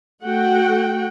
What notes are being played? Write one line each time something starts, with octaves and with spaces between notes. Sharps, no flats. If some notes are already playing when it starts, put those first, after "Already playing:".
A3 F#4 F#5 G5